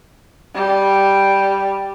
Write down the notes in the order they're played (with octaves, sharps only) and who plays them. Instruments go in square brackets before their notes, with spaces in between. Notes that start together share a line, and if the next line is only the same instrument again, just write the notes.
[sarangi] G3